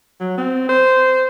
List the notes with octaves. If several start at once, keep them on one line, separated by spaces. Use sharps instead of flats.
F#3
C4
C5